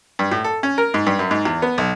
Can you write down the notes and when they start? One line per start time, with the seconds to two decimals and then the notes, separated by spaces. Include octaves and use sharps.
0.19 G2
0.32 A2
0.44 A4
0.63 C#4
0.78 A#4
0.94 G#2
1.07 G2
1.19 F#2
1.31 G#2
1.45 E2
1.62 B3
1.78 B1